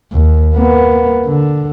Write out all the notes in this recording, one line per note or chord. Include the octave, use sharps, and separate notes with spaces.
D#2
A#3 B3
D3